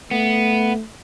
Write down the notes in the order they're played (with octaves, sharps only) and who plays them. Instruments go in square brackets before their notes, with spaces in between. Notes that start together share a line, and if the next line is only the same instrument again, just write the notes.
[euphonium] A3 [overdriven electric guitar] B3